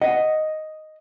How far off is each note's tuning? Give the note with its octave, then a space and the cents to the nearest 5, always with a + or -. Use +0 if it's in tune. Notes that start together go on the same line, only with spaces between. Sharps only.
D#5 +0 F#5 +0